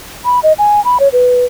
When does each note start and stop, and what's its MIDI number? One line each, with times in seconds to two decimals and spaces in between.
0.25 0.39 83
0.43 0.53 75
0.58 0.83 80
0.85 0.98 83
1.00 1.08 73
1.13 1.45 71